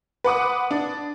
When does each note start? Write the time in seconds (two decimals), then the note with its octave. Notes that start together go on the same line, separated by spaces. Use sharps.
0.24 B4 F#5 D6 D#6
0.71 D4